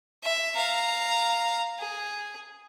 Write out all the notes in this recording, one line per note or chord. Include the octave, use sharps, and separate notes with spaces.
E5
F5 A#5
G#4